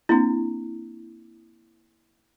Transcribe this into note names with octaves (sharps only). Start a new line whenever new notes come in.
A#3 C4 D4 E4